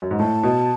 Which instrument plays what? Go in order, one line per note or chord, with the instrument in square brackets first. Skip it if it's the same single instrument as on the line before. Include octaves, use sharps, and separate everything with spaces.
[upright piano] F#2
G#2
[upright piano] A2 [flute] A5
[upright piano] B2